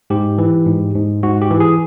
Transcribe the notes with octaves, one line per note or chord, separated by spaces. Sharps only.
G#2 G4
E3
G#2
G#2
G#2 F#4
G4
E3
G#4